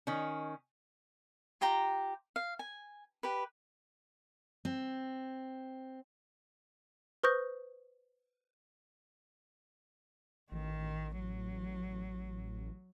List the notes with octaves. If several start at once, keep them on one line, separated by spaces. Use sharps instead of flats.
D#3 C#4
F4 G4 G5 A#5
F5
G#5
G4 B4
C4
B4 C5 C#6 D#6 G6 A#6
A1 D#3
F#3